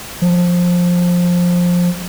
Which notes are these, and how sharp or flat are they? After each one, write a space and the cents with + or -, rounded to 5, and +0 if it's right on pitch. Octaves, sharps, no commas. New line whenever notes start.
F3 +15